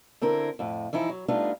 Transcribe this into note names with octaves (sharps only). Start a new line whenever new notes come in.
D3 C4 E4 A#4
F2 A2
E3 F3 D#4 E4
F#3
G3 A3 B3 D4 D#4 F4